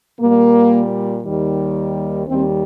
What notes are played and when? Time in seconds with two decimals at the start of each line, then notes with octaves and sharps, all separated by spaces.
0.19 A#2 G3 A#3
1.22 D#2 D#3 G3
2.26 D#2 D#3 G3 C4